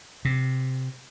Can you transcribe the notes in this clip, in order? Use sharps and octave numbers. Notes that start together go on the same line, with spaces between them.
C3